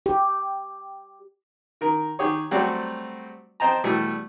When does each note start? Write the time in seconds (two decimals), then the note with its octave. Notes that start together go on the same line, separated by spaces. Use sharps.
0.06 G4
1.81 D#3 A#4
2.19 D#3 G4 G#4 C#5
2.51 F#3 G3 A3 C4 F#4 D5
3.60 C4 C5 D#5 G5 A5 A#5
3.84 B2 E3 G3 A3